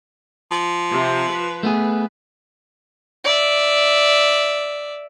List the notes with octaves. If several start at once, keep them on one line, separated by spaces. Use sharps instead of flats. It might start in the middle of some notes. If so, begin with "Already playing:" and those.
F3
C3
B4
A3 B3 G#4
D5 E5